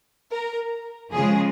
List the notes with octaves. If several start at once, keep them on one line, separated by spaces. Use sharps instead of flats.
A#4
C#3 F3 G#3 G#4